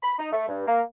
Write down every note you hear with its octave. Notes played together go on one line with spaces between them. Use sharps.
B5
D#4
A3
G2
A#3